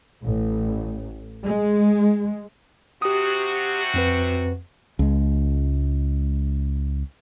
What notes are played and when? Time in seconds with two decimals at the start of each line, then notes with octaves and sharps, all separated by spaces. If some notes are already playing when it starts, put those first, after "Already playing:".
0.24 A1
1.44 G#3
3.02 C3 F#4 G4 D#6
3.94 F2 C4 B4
4.99 C#2 G#3